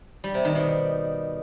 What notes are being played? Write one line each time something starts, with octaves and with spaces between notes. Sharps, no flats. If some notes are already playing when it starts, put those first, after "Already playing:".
G3
C3
D#3
B2